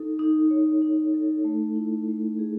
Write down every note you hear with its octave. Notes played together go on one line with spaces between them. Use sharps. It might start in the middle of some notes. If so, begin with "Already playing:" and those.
Already playing: D#4 A4
D#4
C#5
D#4
A4
A3
E4
A3
G#4